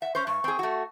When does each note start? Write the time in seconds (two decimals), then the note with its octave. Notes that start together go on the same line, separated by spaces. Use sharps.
0.02 E5 F#5
0.15 C#4 C5 C#6
0.27 G2 C#6
0.44 C4 G#4
0.59 A3 F#4